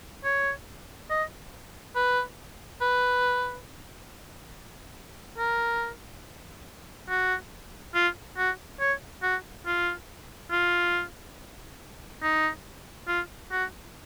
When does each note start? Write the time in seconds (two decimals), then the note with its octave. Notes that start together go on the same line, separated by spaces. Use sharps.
0.25 C#5
1.10 D#5
1.96 B4
2.81 B4
5.38 A#4
7.09 F#4
7.95 F4
8.38 F#4
8.80 C#5
9.23 F#4
9.66 F4
10.51 F4
12.23 D#4
13.08 F4
13.52 F#4